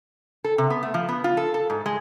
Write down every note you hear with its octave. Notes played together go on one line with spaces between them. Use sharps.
A4
C3
B3
A3
F3
B3
F4
A4
A4
G#2
G#3